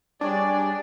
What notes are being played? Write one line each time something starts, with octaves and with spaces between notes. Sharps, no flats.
G3 D4 G#4 C#5 D5 G#5